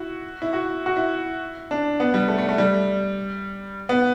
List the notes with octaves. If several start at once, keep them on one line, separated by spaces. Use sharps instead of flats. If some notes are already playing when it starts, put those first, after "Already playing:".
Already playing: E4 F#4
E4
F#4
F#4
E4
D4
B3
G3
A3
A3
A3
G3
B3